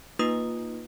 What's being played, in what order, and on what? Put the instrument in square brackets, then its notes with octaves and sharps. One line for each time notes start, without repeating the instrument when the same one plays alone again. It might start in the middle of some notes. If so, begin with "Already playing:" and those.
[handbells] A#3 D#4 F4 B4 D#6